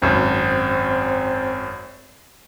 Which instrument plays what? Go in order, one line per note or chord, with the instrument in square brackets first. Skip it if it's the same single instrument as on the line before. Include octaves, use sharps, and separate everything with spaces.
[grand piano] G#1 F#2 [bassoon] C4